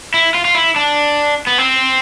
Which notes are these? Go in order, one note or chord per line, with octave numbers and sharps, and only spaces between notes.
E4
F4
F4
E4
D4
B3
C4